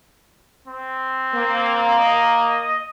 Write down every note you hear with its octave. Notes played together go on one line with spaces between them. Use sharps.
C4
A#3
D#5